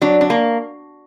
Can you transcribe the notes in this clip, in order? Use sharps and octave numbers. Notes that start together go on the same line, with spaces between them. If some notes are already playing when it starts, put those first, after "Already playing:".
F#3 D4
D4
A#3